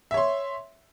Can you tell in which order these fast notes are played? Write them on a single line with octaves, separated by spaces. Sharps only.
E5 C#5 C6